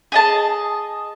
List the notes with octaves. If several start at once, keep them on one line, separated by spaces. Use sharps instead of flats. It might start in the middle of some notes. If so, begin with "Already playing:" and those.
G#4 D#5 A5